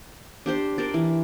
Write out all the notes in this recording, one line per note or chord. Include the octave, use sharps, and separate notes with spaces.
D4 G4 C5
A#4 C5 D5
E3